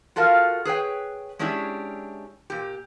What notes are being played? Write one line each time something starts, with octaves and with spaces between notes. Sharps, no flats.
F4 F#4 A4 A#4 F5
G#4 B4 C#5 G5
G#3 C#4 D4 E4 G4
A#2 G4